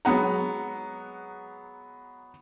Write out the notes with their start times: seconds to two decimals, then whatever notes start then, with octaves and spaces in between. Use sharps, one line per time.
0.05 F#3 G#3 B3 F#5 A#5